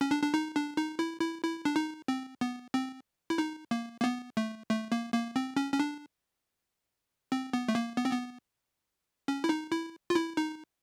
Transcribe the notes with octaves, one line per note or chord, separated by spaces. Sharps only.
C#4
D4
D4
D#4
D4
D#4
E4
E4
E4
D4
D#4
C4
B3
C4
E4
D#4
A#3
A#3
B3
A3
A3
A#3
A#3
C4
C#4
C#4
D4
C4
B3
A3
A#3
B3
C4
B3
C#4
E4
D#4
E4
F4
E4
D#4